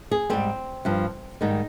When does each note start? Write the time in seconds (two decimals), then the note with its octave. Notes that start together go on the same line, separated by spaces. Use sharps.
0.11 G#4
0.30 G#2 G3 C4
0.85 G2 F3
1.41 G#2 D#3 G3 D#4